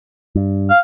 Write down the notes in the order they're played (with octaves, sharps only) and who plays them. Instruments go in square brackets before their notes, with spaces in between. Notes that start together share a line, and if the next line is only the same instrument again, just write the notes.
[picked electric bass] G2
[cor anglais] F5